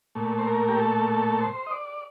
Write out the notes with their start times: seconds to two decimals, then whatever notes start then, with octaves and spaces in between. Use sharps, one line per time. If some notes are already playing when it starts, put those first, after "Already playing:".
0.15 A#2 A3
0.38 C5
0.47 A#4
0.68 G4
0.79 A4
1.10 A4
1.41 C5
1.66 D#5
1.71 D5